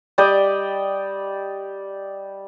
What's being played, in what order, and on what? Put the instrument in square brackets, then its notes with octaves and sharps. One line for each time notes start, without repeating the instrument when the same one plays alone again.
[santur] G3 D5 D#5 G5